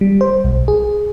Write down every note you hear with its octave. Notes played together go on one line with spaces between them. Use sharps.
G3
C5
B1
G#4